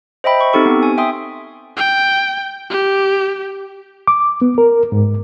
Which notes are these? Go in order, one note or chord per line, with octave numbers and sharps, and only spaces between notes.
C5 D#5 E5 G5 B5
C#6
C4 D#4 G4 A4 C#6
B3
G#5
E5 G5 G#5 C6 D#6
G5
G4
D6
B3
A#4
G#2